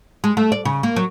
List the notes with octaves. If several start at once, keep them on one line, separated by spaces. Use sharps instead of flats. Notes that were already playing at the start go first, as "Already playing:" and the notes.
G#3
A3
D5
C#3
A#3
F#3